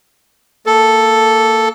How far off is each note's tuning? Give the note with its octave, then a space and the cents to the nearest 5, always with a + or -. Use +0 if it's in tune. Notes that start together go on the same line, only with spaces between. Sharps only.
A#3 -20 A4 +0